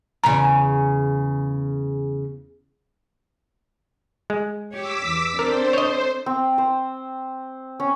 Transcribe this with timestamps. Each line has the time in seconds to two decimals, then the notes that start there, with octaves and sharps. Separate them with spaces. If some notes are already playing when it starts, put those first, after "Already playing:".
0.24 E2 C#3 A#5
4.30 G#3
4.73 G4 C#5 D6 E6 B6
5.06 E2 E3
5.39 C4 D4 A4 A#4 C5
5.73 C#5 D#5
6.26 C4
6.58 C5
7.80 C#4